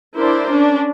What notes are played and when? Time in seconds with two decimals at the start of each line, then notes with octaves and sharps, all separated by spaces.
0.17 D4 E4 A#4 C5 D5
0.51 C#4 D4